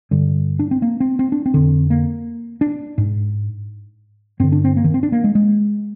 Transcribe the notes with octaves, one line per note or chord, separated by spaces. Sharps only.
G2 D3 G3
D4
C4
A#3
C4
C4
D4
C4
F2 D3
A#3
D4
G#2
G2 D3 C4
D4
C4
A#3
D#3
C4
D4
A#3
G#3
G#3